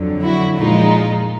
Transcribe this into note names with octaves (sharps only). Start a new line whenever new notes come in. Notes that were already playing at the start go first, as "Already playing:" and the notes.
Already playing: F2 D3 F#3
E4 F#4
A#2 F3 G#3 D#4 F4